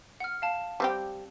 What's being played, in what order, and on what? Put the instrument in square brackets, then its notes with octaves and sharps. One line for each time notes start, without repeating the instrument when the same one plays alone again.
[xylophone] F#5 F6
F5 A5
[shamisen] G3 C4 G4